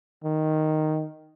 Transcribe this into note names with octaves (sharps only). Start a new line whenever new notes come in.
D#3